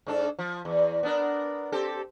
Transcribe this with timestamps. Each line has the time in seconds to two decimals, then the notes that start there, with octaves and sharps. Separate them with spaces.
0.07 G#2 D4 A4
0.39 F3
0.65 E2
1.03 B3 D4 A#4
1.72 C4 G4 A4